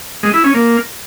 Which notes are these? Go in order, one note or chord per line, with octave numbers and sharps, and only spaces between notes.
G#3
E4
C#4
A#3